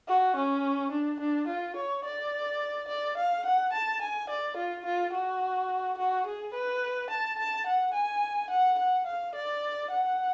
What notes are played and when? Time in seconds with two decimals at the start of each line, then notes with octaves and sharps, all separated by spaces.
0.08 F#4
0.36 C#4
0.92 D4
1.20 D4
1.48 F4
1.76 C#5
2.04 D5
2.88 D5
3.17 F5
3.45 F#5
3.73 A5
4.02 G#5
4.30 D5
4.57 F4
4.86 F4
5.13 F#4
5.98 F#4
6.26 G#4
6.54 B4
7.10 A5
7.39 A5
7.67 F#5
7.94 G#5
8.51 F#5
8.79 F#5
9.06 F5
9.35 D5
9.91 F#5